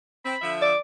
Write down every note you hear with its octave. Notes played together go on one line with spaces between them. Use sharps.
C4 B5
D3 F3 E5
D5 D6